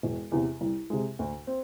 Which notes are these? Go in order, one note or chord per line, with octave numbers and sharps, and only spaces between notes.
E1
E2 C3
C2
C3 G#3
D2
C4